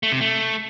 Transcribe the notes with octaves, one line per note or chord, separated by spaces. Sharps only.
A3
C3
A3